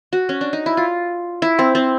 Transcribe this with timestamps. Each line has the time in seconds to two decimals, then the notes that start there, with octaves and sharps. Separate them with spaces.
0.13 F#4
0.29 C#4
0.41 D4
0.53 D#4
0.66 E4
0.77 F4
1.42 E4
1.59 C4
1.75 C4